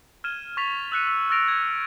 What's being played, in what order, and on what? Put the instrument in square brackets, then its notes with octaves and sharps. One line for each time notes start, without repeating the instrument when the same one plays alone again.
[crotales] F6 G#6 D#7 E7 G7
C#6 F6 A6 B6 F7
E6 F#6 C#7 D#7
E6 B6
E6 F6 A6 A#6 D7 F7
G#6